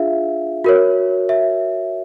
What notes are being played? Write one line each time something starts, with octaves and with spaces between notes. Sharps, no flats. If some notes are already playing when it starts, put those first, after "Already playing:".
Already playing: D4 F4 G#4 E5 F5
F#4 A#4 C#5
E5